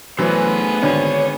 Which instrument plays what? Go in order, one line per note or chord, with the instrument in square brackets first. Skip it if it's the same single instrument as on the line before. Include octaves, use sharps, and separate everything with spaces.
[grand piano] E3 F#3 [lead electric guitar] A3 C5 [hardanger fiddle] B3 G#4
[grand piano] G#1 D3 [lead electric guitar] C#5